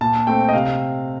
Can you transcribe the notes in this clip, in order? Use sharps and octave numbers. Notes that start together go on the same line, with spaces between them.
A#2 A5
A3 C4 G5
D#5
C3 F5